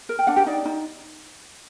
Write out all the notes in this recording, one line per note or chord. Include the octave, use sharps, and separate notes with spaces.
A#4
G5
D4 F#5
G4 G5
D4 D#4 D5
D#4